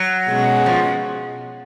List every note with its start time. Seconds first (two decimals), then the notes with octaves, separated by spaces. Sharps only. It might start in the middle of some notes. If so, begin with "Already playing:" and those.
Already playing: F#3
0.29 B2 G#3 C#4 F#4
0.66 F3